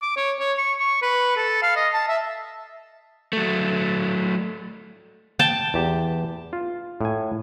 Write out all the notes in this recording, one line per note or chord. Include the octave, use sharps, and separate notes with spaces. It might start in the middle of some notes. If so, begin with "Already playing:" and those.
D6
C#5
C#5
C#6
C#6
B4
A4
F5
D#5
A5
E5
F#3 A3
G5 A5
E2 G4
F4
A2 G#5